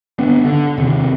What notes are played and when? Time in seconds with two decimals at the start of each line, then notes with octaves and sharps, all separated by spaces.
0.19 G1 B3 D4
0.44 D3
0.77 D#2 C3